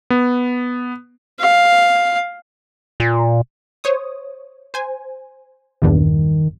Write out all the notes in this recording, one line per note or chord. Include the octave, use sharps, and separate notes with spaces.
B3
F5
A#2
C5 C#5 D#6
C5 G#5
A#1 E2 G2 D#3